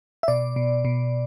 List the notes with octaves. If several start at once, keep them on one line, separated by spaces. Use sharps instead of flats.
E5
B2 D5
B2
B2